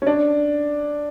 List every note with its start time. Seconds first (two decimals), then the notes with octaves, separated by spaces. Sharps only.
0.02 C#4
0.07 D4